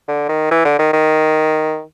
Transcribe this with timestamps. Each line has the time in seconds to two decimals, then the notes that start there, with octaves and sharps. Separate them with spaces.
0.08 D3
0.29 D#3
0.51 E3
0.65 D3
0.79 D#3
0.93 D#3